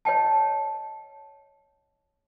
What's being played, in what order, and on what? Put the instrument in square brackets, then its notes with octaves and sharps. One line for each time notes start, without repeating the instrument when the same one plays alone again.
[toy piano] C#5 D#5 G5 A5